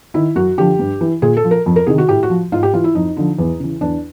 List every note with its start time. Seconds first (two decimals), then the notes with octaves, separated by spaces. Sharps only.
0.14 D#3 E4
0.36 F#2 F#4
0.58 D3 F3 G4
0.79 G2
1.01 E3
1.22 A#2 G#4
1.37 A4
1.44 F3
1.51 A#4
1.66 F2
1.76 A#4
1.87 C3 D#3 G#4
1.98 F#4
2.09 A2 G4
2.23 F#4
2.30 F3
2.52 G#2 F4
2.63 G4
2.73 E3 F4
2.84 E4
2.95 F2 D#4
3.17 D3 F3
3.39 E2
3.60 C#3 E3
3.81 E2 D4